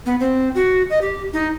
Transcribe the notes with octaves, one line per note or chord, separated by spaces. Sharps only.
B3
C4
F#4
D#5
G4
D#4